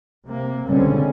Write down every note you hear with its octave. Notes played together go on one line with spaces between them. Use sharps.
C3 A#3
C#2 B2 D3 G3 C4 C#4